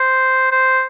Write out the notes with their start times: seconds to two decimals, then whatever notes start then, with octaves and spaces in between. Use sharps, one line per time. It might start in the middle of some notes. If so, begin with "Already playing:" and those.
Already playing: C5
0.52 C5